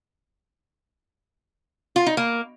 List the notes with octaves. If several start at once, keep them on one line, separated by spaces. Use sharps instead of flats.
F4
D#4
A#3